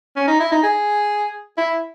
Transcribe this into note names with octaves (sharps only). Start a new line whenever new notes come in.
C#4
D#4
E4
D#4
G#4
E4